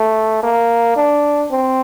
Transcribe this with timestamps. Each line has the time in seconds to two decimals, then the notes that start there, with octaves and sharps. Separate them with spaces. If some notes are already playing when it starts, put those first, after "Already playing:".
Already playing: A3
0.43 A#3
0.96 D4
1.51 C4